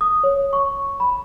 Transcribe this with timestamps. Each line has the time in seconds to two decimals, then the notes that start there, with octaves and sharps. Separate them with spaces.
0.01 D#6
0.23 C#5
0.53 C#6
1.00 B5